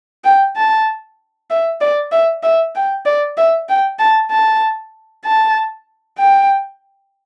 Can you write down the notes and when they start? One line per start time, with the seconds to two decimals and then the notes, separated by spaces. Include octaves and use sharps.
0.24 G5
0.56 A5
1.50 E5
1.81 D5
2.12 E5
2.43 E5
2.75 G5
3.06 D5
3.37 E5
3.69 G5
3.99 A5
4.31 A5
5.25 A5
6.18 G5